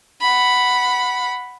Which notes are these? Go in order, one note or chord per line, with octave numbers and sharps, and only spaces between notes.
F#5 B5